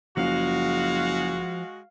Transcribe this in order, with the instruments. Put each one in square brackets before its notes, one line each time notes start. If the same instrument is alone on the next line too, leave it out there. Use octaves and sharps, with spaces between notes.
[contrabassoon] F#1 [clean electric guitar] F3 [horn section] G#3 F#4 [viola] F5